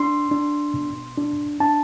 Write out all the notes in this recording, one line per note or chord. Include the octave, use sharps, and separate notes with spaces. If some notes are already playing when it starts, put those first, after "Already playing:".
Already playing: D4 C6
D4
B2
D4
D4 A5